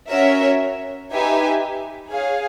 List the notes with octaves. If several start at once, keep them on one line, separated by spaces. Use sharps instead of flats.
C#4 F#4 A#4 C#5 E5
D#4 G4 B4 E5 G#5
G#4 C#5 F5 G#5